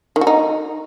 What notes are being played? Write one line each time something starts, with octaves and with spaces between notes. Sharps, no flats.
D#3
F#4
D#4